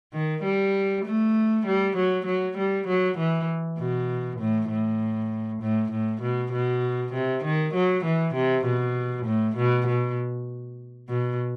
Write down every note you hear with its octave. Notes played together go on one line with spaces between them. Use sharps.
D#3
G3
A3
G3
F#3
F#3
G3
F#3
E3
B2
A2
A2
A2
A2
B2
B2
C3
D#3
F#3
E3
C3
B2
A2
B2
B2
B2